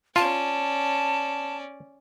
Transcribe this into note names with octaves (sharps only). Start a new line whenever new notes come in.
C#4 F4 D5 A5